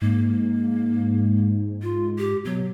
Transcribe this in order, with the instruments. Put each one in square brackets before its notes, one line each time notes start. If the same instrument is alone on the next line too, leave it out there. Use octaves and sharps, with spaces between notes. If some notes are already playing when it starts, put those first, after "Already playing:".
[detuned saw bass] G#2 [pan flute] A#3
[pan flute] F4
G4
[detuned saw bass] B2 [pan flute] F#3